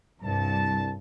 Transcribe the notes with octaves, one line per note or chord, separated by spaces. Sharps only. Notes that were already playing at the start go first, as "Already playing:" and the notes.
C2 G2 A5